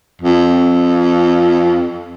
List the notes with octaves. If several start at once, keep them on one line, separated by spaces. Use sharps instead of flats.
F2